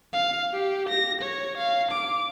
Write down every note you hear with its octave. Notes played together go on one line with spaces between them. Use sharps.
F5
G4
A#6
C#5
F5
D6